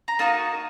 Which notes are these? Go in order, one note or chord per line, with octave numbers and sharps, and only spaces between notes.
A#5
A#3 D#4 F#4 A5